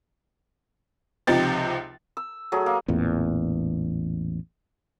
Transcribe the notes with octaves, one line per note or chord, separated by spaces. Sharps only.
C#2 C3 F3 D#4 G4 A6
E6
F#3 A3 G#4
A#3
A1 E2 A#2